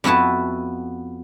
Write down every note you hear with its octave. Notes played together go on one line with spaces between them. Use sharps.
F2 B3 E4 F#4 A5